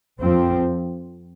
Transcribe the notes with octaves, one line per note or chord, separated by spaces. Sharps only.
F2 F3 C4